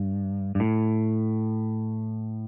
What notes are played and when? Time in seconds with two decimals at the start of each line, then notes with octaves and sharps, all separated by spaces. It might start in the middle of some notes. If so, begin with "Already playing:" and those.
Already playing: G2
0.55 G2
0.60 A2